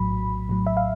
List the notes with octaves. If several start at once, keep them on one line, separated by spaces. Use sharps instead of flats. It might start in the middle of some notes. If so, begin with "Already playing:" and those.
Already playing: A#1 A2 F#3 B5
A#1
A2 F#3
E5
F5